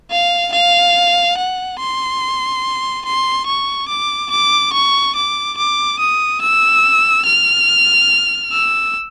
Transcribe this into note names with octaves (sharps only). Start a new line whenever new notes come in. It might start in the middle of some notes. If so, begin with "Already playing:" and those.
F5
F5
F#5
C6
C6
C#6
D6
D6
C#6
D6
D6
D#6
E6
F6
E6